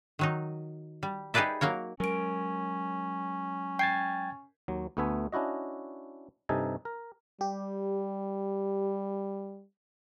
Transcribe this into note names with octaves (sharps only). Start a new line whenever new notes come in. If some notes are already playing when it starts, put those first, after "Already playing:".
D#3 F#3 D#4
G3
D#4 G4 G#4 B4 D5 E5
F#3 A#3 A#4 C#5
F#3 G#3 C#4 A#4 D7
G5 G#6 A6 C7
D#2 F#3
D2 A3 B3 E5 G#5
C#4 D4 E4 F#4 D#5
G2 C3 D#4 A4 G#5
A#4
G3 G4